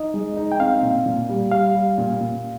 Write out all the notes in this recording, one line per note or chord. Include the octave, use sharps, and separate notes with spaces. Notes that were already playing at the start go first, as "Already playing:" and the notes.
Already playing: D#4 D#5
G#3
D#4
G5
C4 F5
A#2
A#2
G3
G3 F5
G3
A#2
A#2